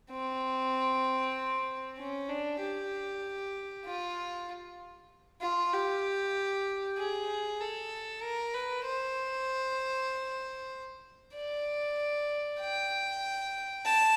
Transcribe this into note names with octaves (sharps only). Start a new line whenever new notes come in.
C4
C#4
D4
G4
F4
F4
G4
G#4
A4
A#4
B4
C5
D5
G5
A5